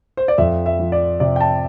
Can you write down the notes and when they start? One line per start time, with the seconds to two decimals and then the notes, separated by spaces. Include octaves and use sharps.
0.17 C5
0.28 D5
0.38 F2 E5
0.66 E5
0.79 F3
0.92 D5
1.20 C3 D5
1.36 G5
1.41 A5